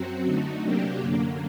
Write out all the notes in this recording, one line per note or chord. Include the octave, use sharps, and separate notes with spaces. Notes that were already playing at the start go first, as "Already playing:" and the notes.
Already playing: F#2 F#3 C4 F#4
D3 A3 D#4 F#4
C3 F#3 A#3 D4 G4
F#2 D3 F#3 A#3